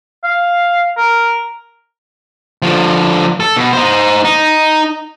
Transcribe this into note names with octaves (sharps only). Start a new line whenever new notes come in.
F5
A#4
D3 F3
A4
B2
D#4 C5
D#4